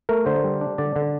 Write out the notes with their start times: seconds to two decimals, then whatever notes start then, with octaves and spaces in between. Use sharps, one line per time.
0.09 A3 A#4
0.26 D3 C5
0.44 G3
0.61 D4
0.78 D3 D5
0.96 D3